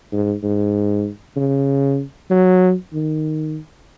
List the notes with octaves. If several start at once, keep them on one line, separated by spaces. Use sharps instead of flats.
G#2
G#2
C#3
F#3
D#3